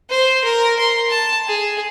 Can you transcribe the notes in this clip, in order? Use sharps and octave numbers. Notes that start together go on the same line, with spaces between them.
C5
A#4
C6
A5
G#4